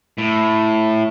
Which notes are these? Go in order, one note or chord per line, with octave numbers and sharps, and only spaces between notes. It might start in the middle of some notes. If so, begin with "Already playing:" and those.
A2